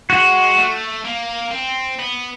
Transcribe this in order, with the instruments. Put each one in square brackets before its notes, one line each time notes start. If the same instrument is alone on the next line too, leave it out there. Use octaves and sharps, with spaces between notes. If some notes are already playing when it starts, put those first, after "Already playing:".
[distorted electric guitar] G#3 [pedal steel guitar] F#4
[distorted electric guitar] A3
A#3
C4
B3